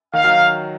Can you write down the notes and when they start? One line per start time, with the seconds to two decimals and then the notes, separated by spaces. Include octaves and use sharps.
0.13 D#3 F5
0.24 D#3 F#3